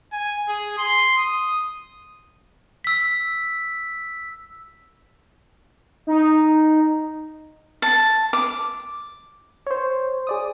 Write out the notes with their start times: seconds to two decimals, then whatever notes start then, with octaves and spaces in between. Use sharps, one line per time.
0.13 G#5
0.48 G#4
0.78 C6
1.18 D#6
2.84 E6 B6
6.07 D#4
7.82 A5
8.33 D6
9.67 C5 C#5
10.27 G#4 D5 D#6